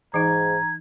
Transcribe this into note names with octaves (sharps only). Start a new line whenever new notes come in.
G#2 E3 D#4 A#5 G#6